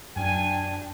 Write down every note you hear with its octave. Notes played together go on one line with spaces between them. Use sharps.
F#2 D4 G5 G#5